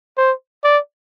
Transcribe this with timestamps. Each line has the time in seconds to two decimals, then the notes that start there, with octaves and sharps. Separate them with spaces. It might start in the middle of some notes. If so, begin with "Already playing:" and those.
0.17 C5
0.64 D5